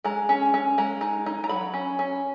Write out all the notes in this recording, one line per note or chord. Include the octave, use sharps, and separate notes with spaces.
G#3 A#5
C#4
C#4
G#3 A#5
D#4
D#4
A#5
F#3 B5
C#4
C#4